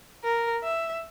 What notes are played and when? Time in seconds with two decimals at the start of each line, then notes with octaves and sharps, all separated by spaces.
0.24 A#4
0.63 E5